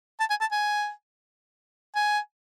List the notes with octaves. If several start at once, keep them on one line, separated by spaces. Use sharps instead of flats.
A5
G#5
A5
G#5
G#5